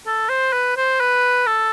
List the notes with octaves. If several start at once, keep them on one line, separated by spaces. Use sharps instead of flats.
A4
C5
B4
C5
B4
A4